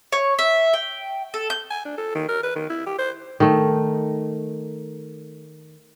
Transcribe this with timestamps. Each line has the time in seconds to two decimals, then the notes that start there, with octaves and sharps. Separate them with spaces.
0.12 C#5
0.39 E5
0.73 G5
1.34 A4
1.50 G6
1.71 G#5
1.85 D4
1.98 A4
2.15 D#3
2.29 A#4
2.43 B4
2.56 D#3
2.69 E4
2.86 G4
2.99 C5
3.40 D#3 A3